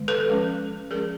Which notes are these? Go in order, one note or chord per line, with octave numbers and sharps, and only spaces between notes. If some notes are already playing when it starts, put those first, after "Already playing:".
Already playing: D#3 G#3 B3
A4 B4
F3 G#3 C#4
F3 G#3 C#4 G#4 A#4